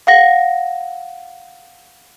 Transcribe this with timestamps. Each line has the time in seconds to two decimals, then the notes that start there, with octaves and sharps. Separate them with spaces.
0.07 F5 F#5 A#6